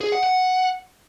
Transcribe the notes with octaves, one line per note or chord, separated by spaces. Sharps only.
G#4
F#5
F#5